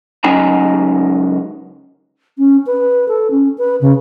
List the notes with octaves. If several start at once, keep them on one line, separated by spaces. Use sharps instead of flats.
C#2 F#3 C#4 D#4 G#5 A#5
C#4
B4
A4
C#4
B4
C#3